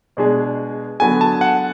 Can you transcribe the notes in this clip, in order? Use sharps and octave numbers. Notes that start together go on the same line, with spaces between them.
B2 G#3 D4 G#4 D5
D3 F#3 B3 F#4 A4 G#5
A5
F#5